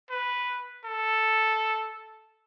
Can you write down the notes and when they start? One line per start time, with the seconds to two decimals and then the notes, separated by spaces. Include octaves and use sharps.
0.11 B4
0.85 A4